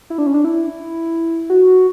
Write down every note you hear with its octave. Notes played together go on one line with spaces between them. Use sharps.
E4
D4
C#4
D4
E4
F#4